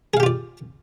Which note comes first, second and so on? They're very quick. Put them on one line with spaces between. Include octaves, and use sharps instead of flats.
G#4 F5 G4 F4 D5